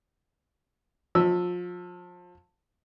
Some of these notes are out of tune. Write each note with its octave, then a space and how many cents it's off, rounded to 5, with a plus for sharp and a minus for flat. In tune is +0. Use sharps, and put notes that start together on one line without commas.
F3 +30 E6 +0